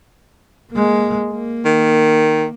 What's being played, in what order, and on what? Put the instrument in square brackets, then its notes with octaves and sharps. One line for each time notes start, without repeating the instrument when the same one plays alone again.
[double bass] G#3 A#3
A#3
[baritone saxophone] D#3